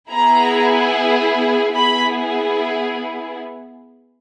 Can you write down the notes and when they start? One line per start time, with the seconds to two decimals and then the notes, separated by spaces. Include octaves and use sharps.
0.11 B3 E4 G#4 A#5
1.75 B3 E4 G#4 B5